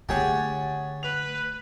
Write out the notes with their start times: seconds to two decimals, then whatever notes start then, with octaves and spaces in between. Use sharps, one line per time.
0.09 D3 A3 G4 G#4 C#5 F#5 A5
1.03 B4 F7